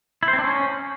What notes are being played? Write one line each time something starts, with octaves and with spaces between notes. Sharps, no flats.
E4
C5
C4
D4
C#4